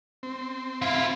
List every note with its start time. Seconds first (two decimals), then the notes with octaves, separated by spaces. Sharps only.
0.23 C4
0.82 E4 F4